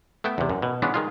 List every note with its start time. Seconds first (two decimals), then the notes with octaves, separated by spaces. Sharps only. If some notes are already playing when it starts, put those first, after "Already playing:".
0.24 A3 B3 E5 G5
0.38 E2 C3
0.49 F#2
0.62 B2
0.82 E3 G#3 B3 C#4 D4 F4
0.94 D#3 G#3 F4